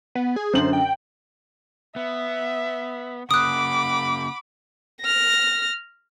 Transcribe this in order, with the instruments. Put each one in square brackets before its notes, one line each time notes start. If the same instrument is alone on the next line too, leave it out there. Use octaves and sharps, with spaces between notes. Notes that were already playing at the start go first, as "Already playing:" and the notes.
[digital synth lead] B3
G#4
[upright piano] F#2 D3 F#7 [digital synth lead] C5
[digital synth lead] G5
[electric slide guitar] B3 [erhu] E5
[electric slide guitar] C#3 A#3 [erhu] F#5 [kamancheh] B5 D6 [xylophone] D#6 F#6
[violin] F6 A#6